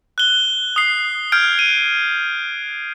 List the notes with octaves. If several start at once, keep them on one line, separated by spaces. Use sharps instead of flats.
F#6 G7
D#6 C7
F6 G6 G#6 D7
D#7